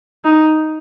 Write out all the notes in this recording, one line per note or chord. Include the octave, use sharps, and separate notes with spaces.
D#4